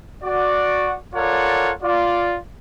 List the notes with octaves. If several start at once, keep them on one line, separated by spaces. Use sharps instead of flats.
F#4 D5
F4 A4 A#4 C#5 D5 F#5
F4 D5